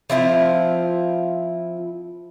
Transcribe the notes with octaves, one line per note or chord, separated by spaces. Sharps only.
F3 C4 E4 F4